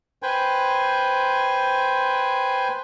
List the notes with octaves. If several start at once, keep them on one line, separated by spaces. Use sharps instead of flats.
B4 C5 G5 G#5